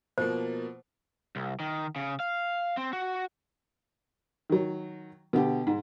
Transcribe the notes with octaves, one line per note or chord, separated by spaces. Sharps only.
B2 F3 A#3 C5
C2
D#3
C#3
F5
C4
F#4
D#3 F#3
B2 D3 G4
G#2